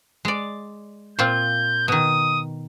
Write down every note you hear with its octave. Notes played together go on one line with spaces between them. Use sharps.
G#3 D5
A#2 C4 F4 G6
B2 D#3 D#6